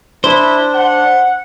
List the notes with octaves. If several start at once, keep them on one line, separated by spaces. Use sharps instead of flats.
D4 E4 C5
F#5